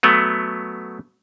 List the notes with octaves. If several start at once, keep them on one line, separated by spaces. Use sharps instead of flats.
F#3 A3 B3